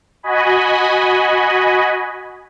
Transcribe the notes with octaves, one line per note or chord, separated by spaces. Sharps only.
F#4 D#5 G#5 B5